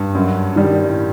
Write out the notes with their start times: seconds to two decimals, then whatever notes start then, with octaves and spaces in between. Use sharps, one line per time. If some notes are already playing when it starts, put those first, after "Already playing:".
Already playing: G2
0.15 F#2
0.56 D#3 G3
0.87 A2